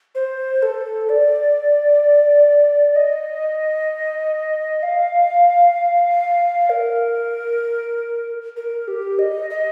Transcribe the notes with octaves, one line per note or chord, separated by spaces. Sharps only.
C5
A4
D5
D#5
F5
A#4
A#4
G4
D#5
D#5